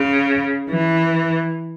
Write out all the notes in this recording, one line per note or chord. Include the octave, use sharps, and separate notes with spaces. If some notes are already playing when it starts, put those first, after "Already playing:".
Already playing: C#3
E3